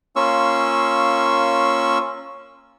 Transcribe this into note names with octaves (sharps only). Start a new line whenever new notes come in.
A#3 C#4 F4 C#6 E6